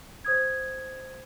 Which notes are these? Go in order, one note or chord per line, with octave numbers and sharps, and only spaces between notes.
C5 D#6 G#6